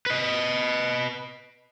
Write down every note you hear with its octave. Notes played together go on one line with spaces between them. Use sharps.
B4 D#5